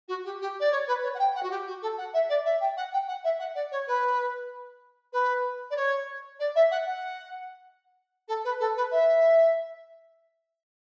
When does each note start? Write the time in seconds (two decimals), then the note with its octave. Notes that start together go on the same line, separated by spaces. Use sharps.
0.08 F#4
0.25 G4
0.41 G4
0.60 D5
0.72 C#5
0.87 B4
1.03 C#5
1.14 F#5
1.19 G5
1.35 F#5
1.43 F#4
1.51 G4
1.67 F#4
1.82 A4
1.98 F#5
2.14 E5
2.29 D5
2.45 E5
2.61 G5
2.77 F#5
2.93 G5
3.08 F#5
3.24 E5
3.39 F#5
3.55 D5
3.72 C#5
3.87 B4
5.13 B4
5.71 D5
5.76 C#5
6.40 D5
6.56 E5
6.71 F#5
6.87 F#5
8.28 A4
8.44 B4
8.60 A4
8.76 B4
8.92 E5